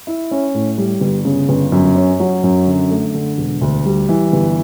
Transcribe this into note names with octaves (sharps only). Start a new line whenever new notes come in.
E4
C#4
A2
G3
G1
C#3
G1
F#2
C#4
F#3
F#2
D3
A3
D3
E1
D2
G3
E3
G1